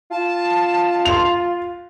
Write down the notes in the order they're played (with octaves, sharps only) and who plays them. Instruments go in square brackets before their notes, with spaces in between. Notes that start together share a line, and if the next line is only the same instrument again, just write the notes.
[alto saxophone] F4 [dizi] A5
[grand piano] C6 F7